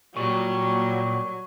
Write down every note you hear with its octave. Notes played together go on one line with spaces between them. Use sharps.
A#2 F#3 G3 C#6